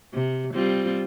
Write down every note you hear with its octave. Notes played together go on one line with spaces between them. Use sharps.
C3
G3 C4 F4